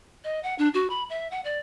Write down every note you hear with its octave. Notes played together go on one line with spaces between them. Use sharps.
D#5
F#5
D4
F#4
B5
E5
F#5
D5